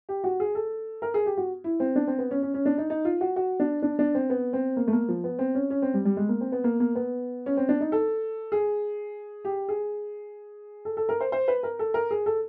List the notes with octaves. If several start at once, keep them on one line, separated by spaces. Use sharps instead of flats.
G4
F#4
G#4
A4
A#4
G#4
G4
F#4
E4
C4
D4
C4
B3
C#4
C#4
C#4
D4
D#4
D#4
F4
F#4
F#4
D4
D4
D4
C4
B3
C4
A#3
A3
A#3
F3
B3
C4
C#4
C#4
C4
G3
G3
G#3
A#3
C4
B3
A#3
A#3
B3
C#4
C4
D4
D#4
A4
G#4
G4
G#4
A4
A4
A#4
C5
C5
B4
A#4
A4
A#4
G#4
A4